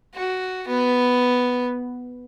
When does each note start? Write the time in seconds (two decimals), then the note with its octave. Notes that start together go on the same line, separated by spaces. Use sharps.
0.14 F#4
0.68 B3 B4